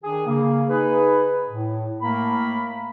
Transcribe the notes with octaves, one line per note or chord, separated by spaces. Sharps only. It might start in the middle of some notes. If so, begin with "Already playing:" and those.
D#3 D4 G#4
C#3 A#3
D#4 G#4 B4
A2
A2 A3 A#3 A#4 B5